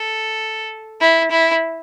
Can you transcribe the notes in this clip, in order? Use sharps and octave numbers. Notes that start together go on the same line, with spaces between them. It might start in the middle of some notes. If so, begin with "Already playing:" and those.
Already playing: A4
E4
E4